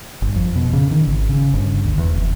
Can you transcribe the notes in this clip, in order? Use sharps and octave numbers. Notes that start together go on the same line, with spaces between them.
G1
F2
B2
C#3
D#3
G#1
C#3
G1
D2
E2
F1